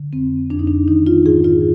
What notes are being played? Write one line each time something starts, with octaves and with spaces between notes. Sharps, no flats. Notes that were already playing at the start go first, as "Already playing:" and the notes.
Already playing: D3
F2 C4
F2 D4
D#4
D4
D#3 D#4
F4
G#2 G#4
F4